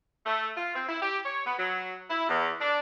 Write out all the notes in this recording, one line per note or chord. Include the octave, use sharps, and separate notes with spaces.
A3
F4
C4
E4
G4
C#5
B3
F#3
E4
E2
D4